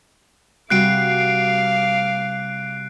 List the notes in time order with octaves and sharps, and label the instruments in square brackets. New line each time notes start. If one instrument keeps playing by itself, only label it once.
[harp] C3 G3 F#4 [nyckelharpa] F5 D6 [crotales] F#6 C7 D7